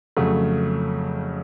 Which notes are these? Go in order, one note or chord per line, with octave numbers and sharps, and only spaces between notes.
F2 C#3 F#3 A3